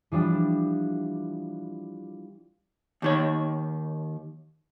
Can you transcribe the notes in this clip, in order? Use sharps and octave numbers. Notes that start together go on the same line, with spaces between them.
E3 F3 G3 D4
D#2 D#3 C#5